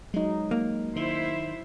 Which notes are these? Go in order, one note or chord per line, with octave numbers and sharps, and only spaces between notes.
F#3 G#3 D#4
A#3
D#3 E4 C5 E5